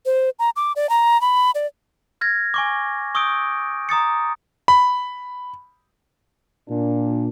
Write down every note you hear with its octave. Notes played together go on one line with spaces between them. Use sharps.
C5
A#5
D6
D5
A#5
B5
D5
F6 G#6 A#6
G#5 C#6 D6
C#6 D#6 E6 G6 D7
A#5 D#6 A6 C#7
B5
A#2 D4